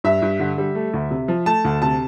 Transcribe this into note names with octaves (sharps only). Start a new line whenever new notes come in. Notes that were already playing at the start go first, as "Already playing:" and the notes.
G2 E5
G2
D3
G3
A3
D2
C3
F3
A3 A5
D2
C3 A5